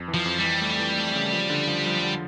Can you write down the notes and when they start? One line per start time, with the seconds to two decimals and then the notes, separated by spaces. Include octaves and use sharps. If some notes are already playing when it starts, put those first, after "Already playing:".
Already playing: F2
0.08 E3
0.14 F3
0.26 F2
0.38 G3
0.43 E3
0.61 A3
0.79 E3
0.97 A3
1.15 C#3
1.33 F3
1.50 D3
1.68 F3
1.86 F3
2.03 D3